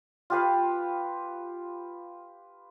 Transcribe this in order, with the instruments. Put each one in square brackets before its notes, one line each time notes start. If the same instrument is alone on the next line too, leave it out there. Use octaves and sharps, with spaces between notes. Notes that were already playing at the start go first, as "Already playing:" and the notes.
[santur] F4 G4 B4 F5